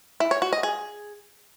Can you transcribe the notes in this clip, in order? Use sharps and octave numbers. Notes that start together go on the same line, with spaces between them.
E4
C#5
F#4
D#5
G#4